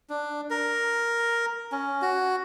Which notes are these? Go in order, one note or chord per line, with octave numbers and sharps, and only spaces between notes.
D4
A#4
C#4
F#4